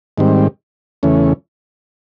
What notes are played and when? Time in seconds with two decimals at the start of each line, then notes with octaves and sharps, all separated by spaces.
0.18 G#2 D#3 G3 C4
1.03 E2 C#3 E3 A3 C#4